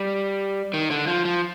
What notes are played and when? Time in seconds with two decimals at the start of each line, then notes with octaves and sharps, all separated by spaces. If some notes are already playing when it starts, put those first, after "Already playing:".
Already playing: G3
0.74 D#3
0.91 D3
1.07 F3
1.25 F3